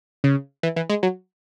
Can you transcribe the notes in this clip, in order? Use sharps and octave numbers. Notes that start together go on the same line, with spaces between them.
C#3
E3
E3
G#3
F#3